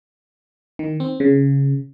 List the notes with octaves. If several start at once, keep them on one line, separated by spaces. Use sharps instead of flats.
D#3
C4
C#3